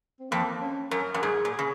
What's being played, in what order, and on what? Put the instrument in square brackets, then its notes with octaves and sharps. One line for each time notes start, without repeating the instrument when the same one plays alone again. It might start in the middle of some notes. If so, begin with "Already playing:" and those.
[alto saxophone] C4
[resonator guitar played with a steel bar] F2 [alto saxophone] A#3
[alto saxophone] C#4
[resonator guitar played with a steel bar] F#2 [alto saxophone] A#4
[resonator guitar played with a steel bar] F#2
[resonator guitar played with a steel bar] G#2 [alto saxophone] G#4
[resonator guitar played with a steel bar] A#2
[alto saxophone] G#4
[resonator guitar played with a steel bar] C#3